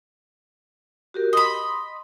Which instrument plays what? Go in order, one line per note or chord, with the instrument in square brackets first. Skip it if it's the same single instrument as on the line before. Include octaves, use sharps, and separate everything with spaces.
[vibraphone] F#4 G4 A#4
[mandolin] D#5 B5 [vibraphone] C6